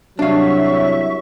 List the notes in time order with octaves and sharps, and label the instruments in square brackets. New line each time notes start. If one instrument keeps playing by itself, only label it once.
[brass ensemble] C2 F#3 [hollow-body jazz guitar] D4 F5 [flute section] E5 C#6